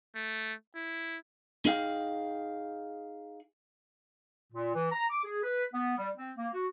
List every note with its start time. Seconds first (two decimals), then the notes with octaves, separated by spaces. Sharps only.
0.15 A3
0.76 E4
1.65 D#4 G#4 F5 G5
4.53 A#2
4.75 E3
4.91 A#5
5.10 D6
5.24 G#4
5.43 B4
5.74 B3
5.98 G3
6.17 C4
6.38 A#3
6.54 F#4